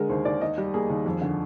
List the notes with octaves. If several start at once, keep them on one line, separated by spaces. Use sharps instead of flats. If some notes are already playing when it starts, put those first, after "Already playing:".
Already playing: D3 G#3 G#4 A#4
D#2 C5
D#2 D5
D#3 D#5
G3
A#3 G#4
D#2
F2
D3